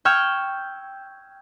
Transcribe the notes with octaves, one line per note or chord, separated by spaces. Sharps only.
G5 C#6 E6 F6 G6 G#6